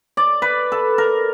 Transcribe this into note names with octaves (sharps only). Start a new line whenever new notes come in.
D5
B4
A4
A#4